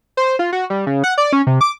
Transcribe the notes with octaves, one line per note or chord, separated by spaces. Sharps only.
C5
F4
F#4
G3
C#3
F#5
D5
C#4
C3
D6